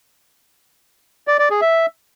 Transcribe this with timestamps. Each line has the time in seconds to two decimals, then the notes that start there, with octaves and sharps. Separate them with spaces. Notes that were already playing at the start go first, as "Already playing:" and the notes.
1.28 D5
1.39 D5
1.50 G#4
1.61 E5